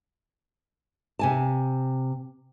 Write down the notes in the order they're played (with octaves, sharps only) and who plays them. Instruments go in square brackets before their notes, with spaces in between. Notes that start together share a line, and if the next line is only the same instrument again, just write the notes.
[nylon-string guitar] C3 G#5 A5